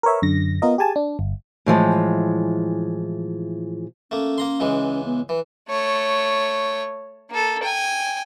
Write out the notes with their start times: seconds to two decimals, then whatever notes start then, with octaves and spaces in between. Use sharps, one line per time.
0.03 A#4 B4 C#5 E5
0.22 F#2 D3 A#6
0.62 B3 F4 A#4 D#5
0.78 G4 G#4 G#5 A5
0.96 D4
1.19 G1
1.66 A2 E3 F3 G#3
4.11 A3 A#3 C#4
4.38 A#3 A#5 C6
4.60 C#2 E3 G#3
5.05 B3
5.29 E3 B4
5.69 A3 C#5
7.30 A#3 A4
7.63 G5 G#5